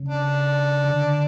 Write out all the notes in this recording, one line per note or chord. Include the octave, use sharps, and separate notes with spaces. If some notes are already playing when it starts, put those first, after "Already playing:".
Already playing: C#3
D4
D3